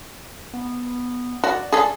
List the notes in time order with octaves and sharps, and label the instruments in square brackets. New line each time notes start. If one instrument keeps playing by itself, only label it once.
[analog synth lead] B3
[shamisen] F#4 [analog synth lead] D5
[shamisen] G#4 A4